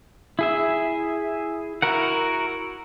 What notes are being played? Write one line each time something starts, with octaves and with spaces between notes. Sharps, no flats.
E4 G#4 E5
E4 F#4 A#4 F#5